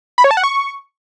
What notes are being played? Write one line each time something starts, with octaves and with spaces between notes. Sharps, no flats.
B5
C#5
A5
F#5
C#6